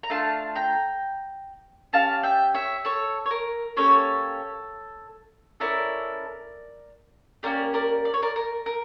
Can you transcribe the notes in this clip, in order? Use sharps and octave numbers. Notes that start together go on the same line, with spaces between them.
A#5
A3 D4 F4 F5 A5
G5 A#5
C#4 G4 F5 A5
E5 G5
C#5 E5
A4 C#5
C#5
A#4
A#3 C#4 G4 A4 C#5
C#4 E4 A4 A#4 D5
A#3 C#4 G4 A#4 D5
A#4 D5
D5
C#5
A#4 D5
A#4
A#4